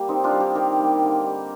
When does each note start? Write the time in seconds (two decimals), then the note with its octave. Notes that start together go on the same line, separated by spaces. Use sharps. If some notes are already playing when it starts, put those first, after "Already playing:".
Already playing: G3 A#3 G4
0.08 D#3 C4 D#4
0.24 D4 F4
0.32 G3 A#3
0.40 D#4 G4
0.55 D#3 G4 A#4
0.79 G3 A#3
1.03 D3
1.26 G3 A#3